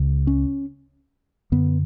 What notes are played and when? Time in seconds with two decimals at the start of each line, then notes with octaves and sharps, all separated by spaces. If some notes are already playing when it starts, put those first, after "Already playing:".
Already playing: C#2 C#3
0.27 C#4
1.52 F#2 D3 B3